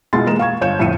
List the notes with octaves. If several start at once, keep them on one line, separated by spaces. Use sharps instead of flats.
B2 G#3 E4 F4 C6 A6
E3 G#3 A#3 A#4 E7
F5 C#6 G#6
G1 C#5 G6 E7
G1 F2 A2 E5 C#7 D#7